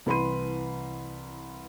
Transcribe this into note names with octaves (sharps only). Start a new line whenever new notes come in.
C2 E3 B4 B5 C6 D#7